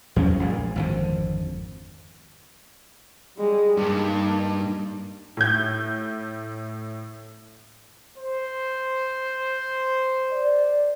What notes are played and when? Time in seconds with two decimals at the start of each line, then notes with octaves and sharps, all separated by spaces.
0.16 E2 F#3 C#4
0.39 A#1 A#2 G#3
0.76 G#1 F2 D3
3.37 G3 G#3
3.77 G2 A#3 D#4
5.37 A2 G6
8.18 C5
10.31 D5